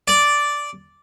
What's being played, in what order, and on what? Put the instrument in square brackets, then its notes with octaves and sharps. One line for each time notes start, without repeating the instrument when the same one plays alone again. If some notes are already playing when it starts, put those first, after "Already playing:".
[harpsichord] D5